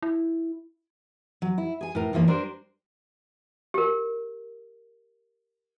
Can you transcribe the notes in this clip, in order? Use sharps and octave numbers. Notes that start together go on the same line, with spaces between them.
E4
F#3
E4
G#4 G#5
A2 A#4
G2 E3 F3 A#3
G3 D4 A#4 C5
G4 A#4